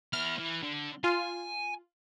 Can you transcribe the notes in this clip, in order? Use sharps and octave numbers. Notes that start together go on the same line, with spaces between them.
B3 E4 F6
E3
D3
F4 G#5